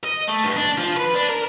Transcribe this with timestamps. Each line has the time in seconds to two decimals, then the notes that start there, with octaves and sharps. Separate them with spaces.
0.04 D#5
0.28 A3
0.44 G2
0.56 D4
0.78 F3
0.97 B4
1.15 D4
1.29 A#4